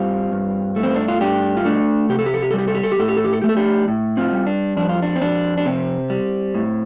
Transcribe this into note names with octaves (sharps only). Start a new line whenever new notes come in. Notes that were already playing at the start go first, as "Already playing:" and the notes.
Already playing: G2 G3 C4 F4
G2
A3
C4
D4
F4
G2 D4 G4
F4
A3 D4
C3 G4
A4
G4
A4
G4
A4
G3 G4
A4
G4
A4
G4
A2 A4
G4
A4
G4
A4
A3 G4
A4
D4 G4
A2
C4 F4
G3
D4
F2 D4
F4
D4
C4
F2 D4
D4
C3 C4
G3
A2